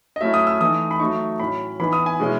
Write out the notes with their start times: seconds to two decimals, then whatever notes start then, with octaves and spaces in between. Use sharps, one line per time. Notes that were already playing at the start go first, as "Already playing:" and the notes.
0.16 D#5
0.21 F#3 A3 C#4 E4 E5
0.34 D#6
0.47 E6
0.60 E3 A3 D#4 D#6
0.91 B5
1.00 F#3 A3 D#4 C#6
1.39 A2 F#3 C#4 B5
1.79 E3 B3 D#4 B5
1.93 D#6
2.06 G#5
2.20 B2 G#3 C#4 E4